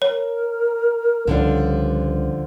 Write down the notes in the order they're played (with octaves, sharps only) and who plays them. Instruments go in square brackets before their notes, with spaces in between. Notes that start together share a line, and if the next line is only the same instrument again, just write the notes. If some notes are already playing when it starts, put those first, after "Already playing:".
[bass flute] A#4 [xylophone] C#5
[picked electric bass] C#2 [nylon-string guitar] D3 F3 D4 [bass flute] G3